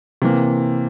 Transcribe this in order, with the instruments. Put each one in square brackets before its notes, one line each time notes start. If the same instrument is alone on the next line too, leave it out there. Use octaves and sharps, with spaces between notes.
[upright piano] C3 E3 A#3